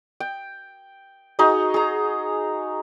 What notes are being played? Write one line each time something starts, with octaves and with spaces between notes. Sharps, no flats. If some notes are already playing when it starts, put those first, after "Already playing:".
G5
D#4 F#4 G#4 D#5
G#4 A#5